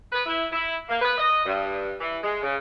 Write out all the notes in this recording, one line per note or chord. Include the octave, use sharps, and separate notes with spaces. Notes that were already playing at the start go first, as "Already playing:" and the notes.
B4
E4
E4
A#3
B4
D#5
G2
E3
G#3
C#3